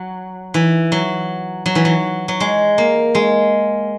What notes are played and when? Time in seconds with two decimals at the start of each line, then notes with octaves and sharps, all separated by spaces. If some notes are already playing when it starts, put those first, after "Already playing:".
Already playing: F#3
0.54 E3
0.92 F#3
1.66 F#3
1.75 E3
1.85 F#3
2.28 F#3
2.40 G#3
2.78 A#3
3.15 G#3